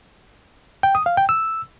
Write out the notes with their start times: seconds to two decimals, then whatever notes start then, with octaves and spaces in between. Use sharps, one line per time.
0.83 G5
0.95 D#6
1.06 F5
1.17 G5
1.29 E6